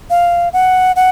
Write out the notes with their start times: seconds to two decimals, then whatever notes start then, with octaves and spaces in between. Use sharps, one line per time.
0.10 F5
0.53 F#5
0.96 F#5